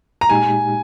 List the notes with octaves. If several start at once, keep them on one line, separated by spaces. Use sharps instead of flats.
A#5
A#2 G#3 D#4 G4 G#5